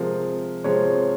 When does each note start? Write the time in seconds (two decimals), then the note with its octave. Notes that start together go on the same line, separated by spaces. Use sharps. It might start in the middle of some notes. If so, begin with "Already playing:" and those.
Already playing: C3 F3 G#3 A#4
0.64 C3 F3 G#3 C#5